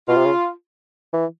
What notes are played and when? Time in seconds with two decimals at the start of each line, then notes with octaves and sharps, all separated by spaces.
0.08 B2 F4
0.17 C3
0.25 C#3
1.13 E3